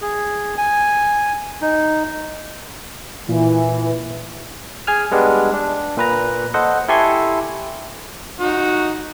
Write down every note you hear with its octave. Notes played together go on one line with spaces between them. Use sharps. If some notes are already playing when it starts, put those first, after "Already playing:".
G#4
G#5
D#4
A#2 E3
G#4 G#5 F6
G3 G#3 B3 D4
D4
A#2 B4 A#5
A4 C5 D#5 F#5
E4 G4 A4 G#5 C6 C#6
D#4 F#4